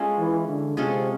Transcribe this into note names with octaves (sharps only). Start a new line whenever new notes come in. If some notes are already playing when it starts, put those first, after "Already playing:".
Already playing: G#3 C#4 F4 A4
E3
D3
C3 G#3 C#4 F4 A4